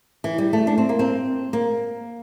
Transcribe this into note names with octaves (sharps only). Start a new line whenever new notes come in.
E3
G3
A3
D4
C4
A#3
C4
A#3